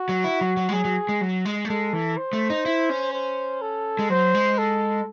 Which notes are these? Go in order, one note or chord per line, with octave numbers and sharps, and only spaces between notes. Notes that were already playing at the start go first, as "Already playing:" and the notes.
Already playing: F#4
F#3
E4
F#3
F#3
G#3
F#3 G#4
F#3
G#3
F#3
G#3
A3
G#3 A4
E3
C5
A3
D#4
E4
C#4
C5
A4
G#3
F#3 C5
G#3
A4